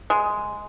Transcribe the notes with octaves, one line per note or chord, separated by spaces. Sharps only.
G#3